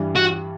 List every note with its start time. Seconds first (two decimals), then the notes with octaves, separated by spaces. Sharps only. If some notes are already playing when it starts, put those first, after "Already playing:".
Already playing: G2 E3 G3
0.16 F#4